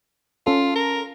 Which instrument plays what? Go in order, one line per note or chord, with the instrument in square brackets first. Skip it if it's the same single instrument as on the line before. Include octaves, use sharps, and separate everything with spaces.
[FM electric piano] C#4 A4 [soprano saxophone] F4
[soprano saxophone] A#4